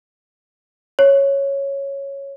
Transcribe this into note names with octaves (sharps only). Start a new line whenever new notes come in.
C#5